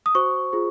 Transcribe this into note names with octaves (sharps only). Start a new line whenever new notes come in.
D#6
F#4 C5 C#6
F4 G#4 C5